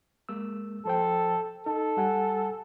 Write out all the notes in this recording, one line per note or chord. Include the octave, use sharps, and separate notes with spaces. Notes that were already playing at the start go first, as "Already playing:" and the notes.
G#3 A#3 E6
F3 A4 C5 G5
D#4 A4
G3 F#5 G#5